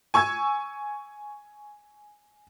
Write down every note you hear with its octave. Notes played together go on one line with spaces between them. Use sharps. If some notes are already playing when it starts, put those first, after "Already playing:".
G#5 C#6 E6 G#6